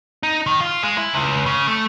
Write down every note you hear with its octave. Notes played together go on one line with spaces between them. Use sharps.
D#4
D#3
F4
G#3
E4
C#2
C#3
A3